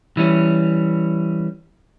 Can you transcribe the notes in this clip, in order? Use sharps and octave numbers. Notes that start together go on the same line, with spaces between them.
E3 G3 C#4